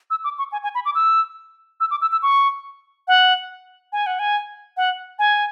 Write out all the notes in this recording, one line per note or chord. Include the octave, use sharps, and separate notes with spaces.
E6
D6
C#6
G#5
G#5
B5
D6
E6
E6
D6
E6
E6
C#6
F#5
G#5
F#5
G#5
F#5
G#5